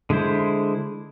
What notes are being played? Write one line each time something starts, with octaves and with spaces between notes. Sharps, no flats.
D3 G#3 E4 C5